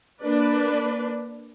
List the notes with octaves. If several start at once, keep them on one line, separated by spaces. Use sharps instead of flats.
A#3 D4 B4 D5